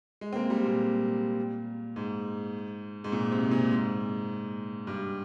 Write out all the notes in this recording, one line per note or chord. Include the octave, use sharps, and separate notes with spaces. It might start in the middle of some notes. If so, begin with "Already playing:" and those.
G#3
C4
A#3
G3
A#2
G#2
G#2
A#2
C3
A#2
G#2
G2